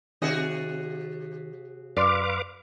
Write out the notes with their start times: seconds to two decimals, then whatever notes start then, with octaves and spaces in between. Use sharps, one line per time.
0.22 C3 D#3 F#4 G#4 D#5 E5
1.97 F#2 B4 D5 F5 C6 D6